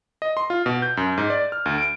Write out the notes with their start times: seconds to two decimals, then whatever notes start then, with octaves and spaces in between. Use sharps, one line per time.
0.22 D#5
0.37 C6
0.50 F4
0.66 B2
0.82 G6
0.97 F#2
1.18 G#2
1.30 D5
1.52 F6
1.66 D2
1.78 D7